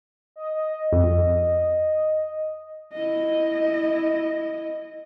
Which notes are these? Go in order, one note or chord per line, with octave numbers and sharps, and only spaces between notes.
D#5
D#5
F2
E4 D#5